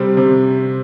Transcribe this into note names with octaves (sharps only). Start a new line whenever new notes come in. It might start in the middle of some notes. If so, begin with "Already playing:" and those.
Already playing: C3 G3 C4
C3